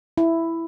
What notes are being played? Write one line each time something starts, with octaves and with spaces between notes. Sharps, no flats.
E4